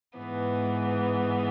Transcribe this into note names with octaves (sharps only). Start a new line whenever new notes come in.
G#2 E3 B3